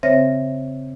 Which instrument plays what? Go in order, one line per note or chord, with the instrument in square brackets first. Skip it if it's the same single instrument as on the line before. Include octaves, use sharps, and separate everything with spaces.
[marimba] C#3 C4 C5 C#5 E5 A#6